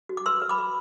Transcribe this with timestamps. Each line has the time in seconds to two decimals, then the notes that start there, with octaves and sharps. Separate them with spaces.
0.09 F#4
0.17 D6
0.26 B4 C6 E6
0.42 B4
0.49 B5 D6
0.58 B4